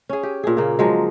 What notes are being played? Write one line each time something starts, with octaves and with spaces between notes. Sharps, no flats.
C#4 G#4
G4
A#2 G#4
C#3 A#3
F3 F#3 G#3